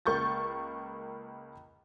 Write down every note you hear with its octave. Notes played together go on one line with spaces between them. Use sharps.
C#2 A#3 C#6 G6 A6